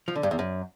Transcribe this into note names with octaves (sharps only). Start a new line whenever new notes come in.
F3
D3
G2
E2
F#2